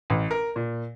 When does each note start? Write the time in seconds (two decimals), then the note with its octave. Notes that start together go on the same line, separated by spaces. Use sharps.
0.10 A1
0.31 A#4
0.56 A#2